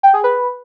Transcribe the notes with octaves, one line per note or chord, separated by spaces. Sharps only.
G5
G#4
B4